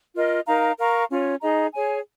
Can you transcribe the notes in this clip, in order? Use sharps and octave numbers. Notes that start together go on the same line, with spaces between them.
F4 A#4 D#5
D#4 A#4 F5 A#5
A#4 F5 A#5 C#6
C#4 F4 C#5
D#4 G#4 D#5 A#5
G#4 C#5 G#5